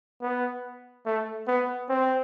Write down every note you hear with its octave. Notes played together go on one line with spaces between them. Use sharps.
B3
A3
B3
C4